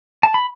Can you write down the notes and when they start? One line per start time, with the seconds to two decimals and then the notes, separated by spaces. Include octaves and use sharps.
0.23 A5
0.34 B5